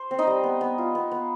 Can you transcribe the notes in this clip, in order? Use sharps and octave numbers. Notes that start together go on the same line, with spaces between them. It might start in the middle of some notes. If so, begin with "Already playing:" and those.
Already playing: C5
C4
D#4 D#5
G3
B3
B3
F4
B3
B3